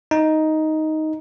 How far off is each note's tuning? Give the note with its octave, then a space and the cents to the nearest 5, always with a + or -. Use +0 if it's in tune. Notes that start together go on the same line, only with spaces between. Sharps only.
D#4 +5